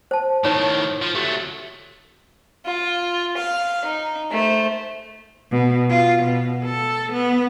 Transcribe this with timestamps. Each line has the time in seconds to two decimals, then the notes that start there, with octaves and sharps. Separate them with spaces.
0.11 C5 A5
0.45 A2 D#3 D#4 C#5
1.02 F3
1.15 F#3 A3 G4
2.65 F4
3.37 F5
3.84 D#4
4.31 A3 C5
5.52 B2
5.90 F4
6.23 B2
6.65 A4
7.13 B3